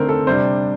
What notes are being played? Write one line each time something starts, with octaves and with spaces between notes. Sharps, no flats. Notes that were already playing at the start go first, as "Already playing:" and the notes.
Already playing: D3 A3 C4 A#4 C5
A4
C3 G3 D4 C5